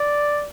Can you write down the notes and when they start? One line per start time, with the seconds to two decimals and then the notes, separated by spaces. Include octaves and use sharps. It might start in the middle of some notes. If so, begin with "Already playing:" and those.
Already playing: D5